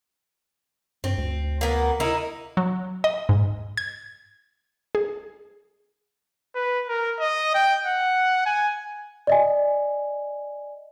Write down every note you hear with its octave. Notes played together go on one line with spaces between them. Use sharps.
G2 C4
D2
A#3 B3
A#3 D#4 E4
F#3
D#5
G#2
G#6
G#4
B4
A#4
D#5
G5
F#5
G#5
D5 D#5 G#5